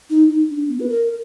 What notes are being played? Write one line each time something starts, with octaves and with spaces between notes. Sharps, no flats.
D#4
D#4
D4
B3
B4
A#4